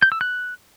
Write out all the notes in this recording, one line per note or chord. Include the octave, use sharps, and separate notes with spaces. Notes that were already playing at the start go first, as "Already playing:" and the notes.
G6
E6
F#6